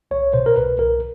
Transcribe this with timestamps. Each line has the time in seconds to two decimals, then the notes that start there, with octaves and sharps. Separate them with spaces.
0.11 C2 C#5
0.34 B2 C5
0.46 A#4
0.56 C2 B4
0.78 C2 A#4